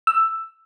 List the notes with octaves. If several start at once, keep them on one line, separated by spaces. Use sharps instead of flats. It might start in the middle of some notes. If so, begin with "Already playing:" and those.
E6